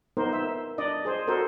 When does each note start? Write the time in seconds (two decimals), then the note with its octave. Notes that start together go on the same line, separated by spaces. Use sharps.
0.17 B3 D#4 A#4 C5
0.33 E5
0.78 D4 D5 D#5
1.05 G#4 C5
1.27 F#4 A4 A#4 C5